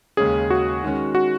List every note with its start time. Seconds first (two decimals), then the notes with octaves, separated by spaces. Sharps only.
0.17 D#2 C#3 G#3 C#4 G#4
0.50 F#4
0.83 D#3 G#3 C#4
1.15 F#4